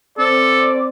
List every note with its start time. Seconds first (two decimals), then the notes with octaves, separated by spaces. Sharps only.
0.18 C4 A4 D5